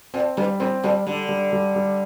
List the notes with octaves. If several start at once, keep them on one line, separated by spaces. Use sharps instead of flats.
A#2 C4
G2 G3
A2 C4
A#2 G3
D3 G3
G3
G3
G3